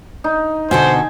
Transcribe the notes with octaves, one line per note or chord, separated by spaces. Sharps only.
D#4
B2 D3 A4 C5 G#5